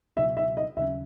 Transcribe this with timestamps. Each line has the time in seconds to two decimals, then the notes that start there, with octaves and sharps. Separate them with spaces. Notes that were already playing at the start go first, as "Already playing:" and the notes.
0.17 C#2 B2 F#3 E5
0.37 E5
0.57 D#5
0.77 D#2 C#3 F#3 C#4 E5